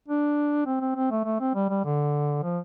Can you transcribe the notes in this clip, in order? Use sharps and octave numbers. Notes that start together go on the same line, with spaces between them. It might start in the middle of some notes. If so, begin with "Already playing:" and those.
D4
C4
C4
C4
A3
A3
C4
G3
G3
D3
F3